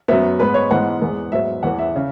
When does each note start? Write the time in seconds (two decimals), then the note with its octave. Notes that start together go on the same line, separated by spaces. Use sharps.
0.08 F#2 F#3 B3 E5
0.39 G#2 G#3 B3 B4
0.54 C#5
0.71 G#2 E3 G#3 B3 F#5
1.02 E2 E3 G#3 B3
1.32 G#2 F#3 B3 E5
1.63 E2 E3 B3 F#5
1.79 E5
1.96 C#3